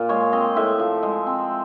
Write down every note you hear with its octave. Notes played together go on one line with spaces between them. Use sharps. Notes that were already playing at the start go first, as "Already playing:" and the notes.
Already playing: A#2 A#3
G#3 C#5
C4 D#5
A2 E5
F3
G#3
C4